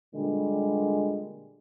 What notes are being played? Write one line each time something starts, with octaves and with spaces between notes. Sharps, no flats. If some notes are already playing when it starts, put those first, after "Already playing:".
A#2 D3 G3 G#3